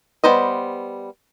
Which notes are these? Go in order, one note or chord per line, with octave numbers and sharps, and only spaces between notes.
G3 B3 C5 D#5